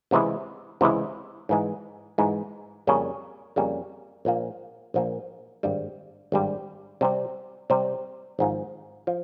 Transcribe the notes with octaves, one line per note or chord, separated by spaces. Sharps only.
C#2 C3 E3 G#3 E4
C#2 C3 E3 G#3 E4
G#2 E3 G#3
G#2 E3 G#3
F2 C#3 G3 A#3 C#4
F2 C#3 G3 A#3 C#4
A#1 A#2 F3 A#3
A#1 A#2 F3 A#3
G#1 G2 G3
G#1 G2 G3
C3 G3 C4
C3 G3 C4
G#1 G#2 F3
F3